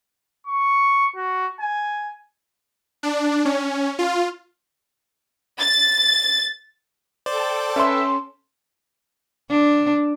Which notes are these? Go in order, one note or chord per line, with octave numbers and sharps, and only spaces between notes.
C#6
F#4
G#5
D4
C#4
F4
A6
A4 C5 D5 G5 A5
C#4 B4 E5 C6
D4